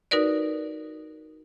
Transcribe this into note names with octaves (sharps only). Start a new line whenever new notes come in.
D#4 F#4 A#4 B4 D5